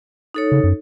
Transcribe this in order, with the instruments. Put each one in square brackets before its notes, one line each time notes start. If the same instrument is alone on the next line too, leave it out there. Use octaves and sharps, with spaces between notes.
[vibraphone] D#4 A4 C#5
[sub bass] C#3
F#2